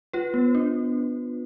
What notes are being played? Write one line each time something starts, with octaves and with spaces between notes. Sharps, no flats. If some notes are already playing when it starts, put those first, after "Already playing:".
F4 B4
B3
D4